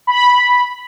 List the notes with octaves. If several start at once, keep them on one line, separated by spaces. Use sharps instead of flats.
B5